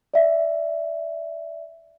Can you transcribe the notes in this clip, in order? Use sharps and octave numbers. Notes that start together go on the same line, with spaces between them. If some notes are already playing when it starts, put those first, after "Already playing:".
D5 E5